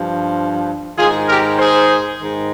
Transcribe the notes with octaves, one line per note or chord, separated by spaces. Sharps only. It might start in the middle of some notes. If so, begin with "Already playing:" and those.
Already playing: G2 F3
G#2 D#3 F4 G#4
G4 A#4
G#4 C5
G#2 D#3